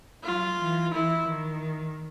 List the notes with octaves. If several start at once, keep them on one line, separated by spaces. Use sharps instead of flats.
F#3 F4
E3
E3 E4
D#3